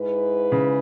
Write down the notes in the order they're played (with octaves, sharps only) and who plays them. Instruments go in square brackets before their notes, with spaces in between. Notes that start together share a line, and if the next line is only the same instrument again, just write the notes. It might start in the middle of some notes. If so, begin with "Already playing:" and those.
Already playing: [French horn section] G#2 G#3 E4 B4
[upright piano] C#3